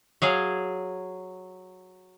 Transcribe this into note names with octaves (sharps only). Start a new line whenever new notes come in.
F#3 G#4 F5